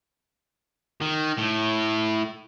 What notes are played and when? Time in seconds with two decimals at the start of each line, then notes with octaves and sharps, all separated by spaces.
1.01 D#3
1.38 A2